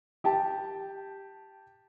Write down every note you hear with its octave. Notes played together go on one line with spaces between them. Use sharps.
G4 G5 A5